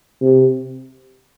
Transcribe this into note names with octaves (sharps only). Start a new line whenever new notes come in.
C3